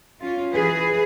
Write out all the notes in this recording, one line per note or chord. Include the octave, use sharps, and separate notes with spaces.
C#4 F4
E3 G#4 B4